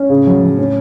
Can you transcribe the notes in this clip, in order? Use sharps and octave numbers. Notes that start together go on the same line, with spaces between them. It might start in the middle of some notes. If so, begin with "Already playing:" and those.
Already playing: C#4
A2 C#3
F#3
F#3
C#4